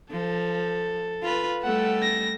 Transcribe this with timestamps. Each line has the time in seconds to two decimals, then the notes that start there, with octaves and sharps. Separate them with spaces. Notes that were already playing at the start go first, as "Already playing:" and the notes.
0.11 F3 A4
1.22 F4 B4
1.63 G3 A3 A4 F#5
2.03 A#6